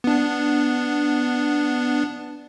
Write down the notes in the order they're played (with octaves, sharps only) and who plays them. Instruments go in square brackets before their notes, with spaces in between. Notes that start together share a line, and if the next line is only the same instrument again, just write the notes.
[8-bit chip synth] B3 D4